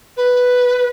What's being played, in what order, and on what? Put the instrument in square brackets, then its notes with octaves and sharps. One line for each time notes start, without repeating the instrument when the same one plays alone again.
[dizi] B4